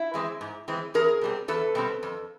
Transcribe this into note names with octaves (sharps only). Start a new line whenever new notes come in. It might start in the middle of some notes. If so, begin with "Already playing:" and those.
Already playing: E4
E3 G#3 C4
G#2
E3 G#3 C4
E2 G#4 A#4
B2 G3 C4
E2 A4 B4
B2 G3 C4
F2